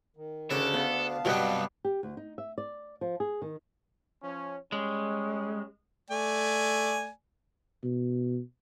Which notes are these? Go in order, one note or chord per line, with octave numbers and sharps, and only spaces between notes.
D#3
D2 C#3 D4 A4
B3 F5 A5
C2 G2 B2 F#3 G3 B3 G5
G4
D2
D#4
E5
D5
F3
G#4
D#3
F3 C#4
G3 G#3 C#4
A3 D5 G#5
B2